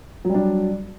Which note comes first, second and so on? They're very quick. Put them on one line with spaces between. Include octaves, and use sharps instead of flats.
F#3 G3 D4